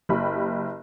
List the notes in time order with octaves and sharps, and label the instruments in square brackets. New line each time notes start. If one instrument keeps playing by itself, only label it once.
[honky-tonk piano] F#1 G4 B5